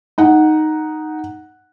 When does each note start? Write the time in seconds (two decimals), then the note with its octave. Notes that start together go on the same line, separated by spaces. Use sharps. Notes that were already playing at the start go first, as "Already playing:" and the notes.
0.18 D#4 F#5